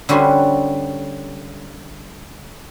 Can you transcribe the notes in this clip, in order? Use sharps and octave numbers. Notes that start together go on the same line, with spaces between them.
D3 G3 C#4 F#4 B4 C5